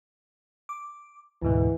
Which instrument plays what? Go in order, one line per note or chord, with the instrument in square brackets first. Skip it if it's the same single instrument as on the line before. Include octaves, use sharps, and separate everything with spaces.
[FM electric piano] D6
[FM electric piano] D2 G#2 B2 [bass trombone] E3